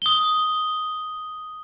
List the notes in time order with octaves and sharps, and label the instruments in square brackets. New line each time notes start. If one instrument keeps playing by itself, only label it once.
[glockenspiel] D#6 G7